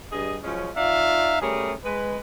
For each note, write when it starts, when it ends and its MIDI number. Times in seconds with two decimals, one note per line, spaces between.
0.12 0.38 43
0.12 0.38 55
0.12 0.38 68
0.12 0.38 75
0.43 0.70 53
0.43 0.70 54
0.43 0.70 56
0.43 0.70 61
0.76 1.36 63
0.76 1.36 65
0.76 1.36 74
0.76 1.36 76
0.76 1.36 77
1.42 1.73 55
1.42 1.73 57
1.42 1.73 61
1.42 1.73 68
1.42 1.73 70
1.84 2.18 56
1.84 2.18 71